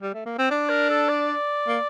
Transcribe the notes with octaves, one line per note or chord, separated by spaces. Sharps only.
G3
A3
A#3
C4
D4 D5
A#4
A4
D5
A#3